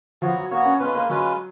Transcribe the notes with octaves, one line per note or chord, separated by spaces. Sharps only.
F3 B3 F#4 C#5
F#3
A#3 B3 F#4 C#5
C#4
G#3 B3 C#4 F4 B4
A#3
F#3 G#3 C#4 F4 B4